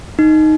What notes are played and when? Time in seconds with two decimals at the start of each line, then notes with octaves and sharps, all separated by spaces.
0.19 D#4